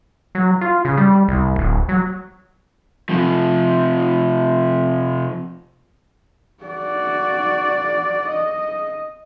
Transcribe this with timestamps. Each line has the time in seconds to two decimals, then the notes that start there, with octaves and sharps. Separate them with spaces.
0.35 F#3
0.61 F4
0.85 C#3
0.97 G3
1.28 C2
1.56 D1
1.89 F#3
3.09 C3 F3
6.64 F#4 D5
8.29 D#5